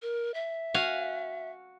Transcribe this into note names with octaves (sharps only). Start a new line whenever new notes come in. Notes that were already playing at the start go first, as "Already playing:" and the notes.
A#4
E5
F#4 F5 G#5